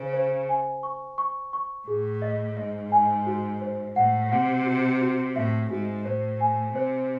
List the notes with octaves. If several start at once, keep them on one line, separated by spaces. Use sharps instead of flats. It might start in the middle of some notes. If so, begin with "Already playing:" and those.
Already playing: C#3 C5
C5
G#5
C#6
C#6
C#6
A2 G#4
D#5
G#2 D#5
G#5
F#4
C5
A2 F#5
C3 F#5
F#4
F#4
A2 E5
G#2 F#4
A2 C5
G#5
C3 C5